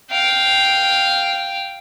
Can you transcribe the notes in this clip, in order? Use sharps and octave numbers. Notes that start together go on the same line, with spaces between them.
F5 G5